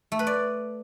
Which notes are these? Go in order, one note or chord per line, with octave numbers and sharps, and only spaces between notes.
A3
B4
D5